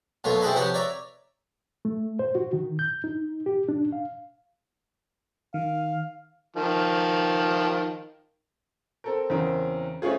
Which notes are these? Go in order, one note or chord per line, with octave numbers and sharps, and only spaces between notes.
B1 B2 A3 A#3 F4 C#5
C4 E4 G#4 A4 B4 D#5
C3 F3 G4 B4 C#5 F#5
C#5 D5 E5 A#5
A3
C5
F#4
D#3
G6
D#4
G4
D4
F5
D#3 F5
D#3 F3
C4 A4 A#4
E2 C#3 C4 A#4
A3 C4 C#4 F4 G#4